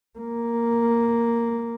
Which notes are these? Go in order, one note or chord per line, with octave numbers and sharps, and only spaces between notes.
A#3